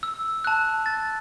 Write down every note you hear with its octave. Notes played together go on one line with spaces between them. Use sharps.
E6
A5 F#6
A6